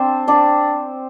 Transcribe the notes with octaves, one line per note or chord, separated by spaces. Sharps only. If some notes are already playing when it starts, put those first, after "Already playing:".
Already playing: C4 D4 C5 D5
D4 D5